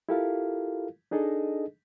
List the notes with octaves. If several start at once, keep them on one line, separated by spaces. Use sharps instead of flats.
E4 F4 G4 A4 A#4 F5
D4 D#4 G#4 A4 D#5